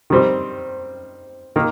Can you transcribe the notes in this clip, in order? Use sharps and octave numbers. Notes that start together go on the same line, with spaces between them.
D#3 G3 C4
D#3 A#3